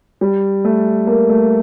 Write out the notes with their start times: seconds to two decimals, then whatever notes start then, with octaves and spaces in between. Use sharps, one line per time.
0.21 G3
0.65 A3
1.07 A#3
1.29 A3